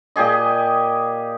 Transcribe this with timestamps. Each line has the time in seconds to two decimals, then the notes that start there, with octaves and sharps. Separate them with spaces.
0.16 A#2 G4 G#4 D#5